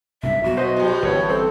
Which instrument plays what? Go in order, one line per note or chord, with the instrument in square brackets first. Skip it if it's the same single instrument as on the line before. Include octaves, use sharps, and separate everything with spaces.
[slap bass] B1 G2 C3 [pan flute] E5
[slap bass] B1 B2 F#3 [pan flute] F#4
[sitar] B4 [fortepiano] C5 D#5
[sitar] A2 G3
[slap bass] G1 E3 [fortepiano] B3 C#5
[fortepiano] C4 [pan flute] A4